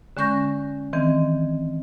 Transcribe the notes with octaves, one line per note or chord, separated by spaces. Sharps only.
D3 G#3 C#4 C#6 G6 A#6
D#3 E3 C4